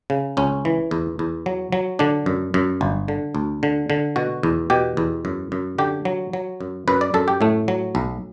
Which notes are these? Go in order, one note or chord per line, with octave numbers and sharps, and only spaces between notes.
C#3
C#2 C#4
E3
E2
E2
F#3
F#3
D3 D4
F#2
F#2
G1
D3
D2
D3
D3
B2 F#4
E2
B2 G4
E2
F#2
F#2
D3 G4
F#3
F#3
F#2
F#2 B4
D5
F#2 A4
G4
A2 A3
F#3
B1